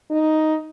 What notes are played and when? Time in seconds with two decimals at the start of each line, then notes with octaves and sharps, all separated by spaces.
0.11 D#4